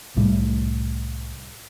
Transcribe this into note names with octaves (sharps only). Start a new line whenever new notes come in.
C2 A2 G3 A3